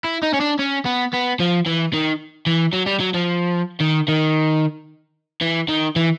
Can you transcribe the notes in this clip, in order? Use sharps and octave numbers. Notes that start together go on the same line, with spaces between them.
E4
D#4
C#4
D4
C#4
B3
B3
F3
E3
D#3
E3
F#3
G3
F#3
F3
D#3
D#3
E3
D#3
E3